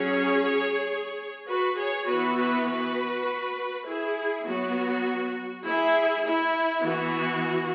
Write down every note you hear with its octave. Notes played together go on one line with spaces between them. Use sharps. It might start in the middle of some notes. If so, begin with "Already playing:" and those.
Already playing: F#3 C#4 G#4 C#5
F#4 B4
G#4 C#5
E3 B3 F#4 B4
F#4 B4
F#4 B4
E4 G#4
F#3 B3 F#4
E4 G#4
E4
E3 B3 F#4